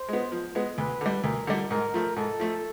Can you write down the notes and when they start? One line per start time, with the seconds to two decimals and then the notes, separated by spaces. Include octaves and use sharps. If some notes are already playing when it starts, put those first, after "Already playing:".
Already playing: C5
0.08 G#3 B3
0.32 F3
0.55 G#3 B3
0.78 D2 B4
1.01 D3 G3
1.24 D2 A#4
1.47 D3 G3
1.71 G#2 A#4
1.94 F3 A3
2.16 G#2 A4
2.40 F3 A3